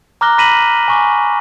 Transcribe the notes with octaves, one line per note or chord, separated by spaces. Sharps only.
A#5 D6 F6 F#6 A#6 G7
B5 A#6 B6 D#7 E7 F#7
G#5 C#6 D6